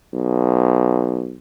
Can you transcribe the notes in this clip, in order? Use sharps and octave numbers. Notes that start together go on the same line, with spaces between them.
B1